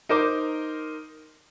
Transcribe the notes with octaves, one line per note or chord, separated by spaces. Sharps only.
D#4 A#4 C5 D6